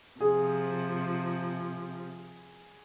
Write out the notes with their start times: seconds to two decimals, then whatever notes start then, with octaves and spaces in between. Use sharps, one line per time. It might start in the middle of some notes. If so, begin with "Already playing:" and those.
0.20 C3 F3 G#4